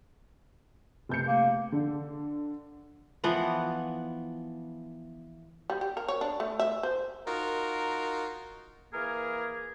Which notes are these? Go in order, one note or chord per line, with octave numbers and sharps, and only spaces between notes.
F1 G6 C#7
A#3
D3
E3 F3 B3 F#5
G3
G4
A#4
C#5
D4
A3
E5
C5
D#4 F4 F#4 A#4
E3 A#3 G#4 A#4